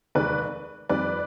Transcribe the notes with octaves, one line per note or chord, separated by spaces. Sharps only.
F1 D#2 D#3 G#3 B4 D5
F2 D#3 G3 B4 D5